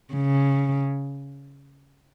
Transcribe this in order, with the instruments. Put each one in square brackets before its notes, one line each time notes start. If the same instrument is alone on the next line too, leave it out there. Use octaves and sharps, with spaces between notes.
[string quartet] C#3